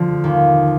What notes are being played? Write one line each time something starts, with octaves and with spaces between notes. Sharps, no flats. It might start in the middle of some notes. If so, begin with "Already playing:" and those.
Already playing: D3 F3
D#2